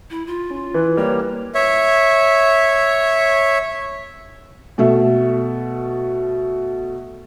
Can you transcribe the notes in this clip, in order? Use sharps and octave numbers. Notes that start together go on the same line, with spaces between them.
E4
F4
C#4
E3 B4 F#6
G3 A#3 C#5
C#5 E5
B2 A3 E5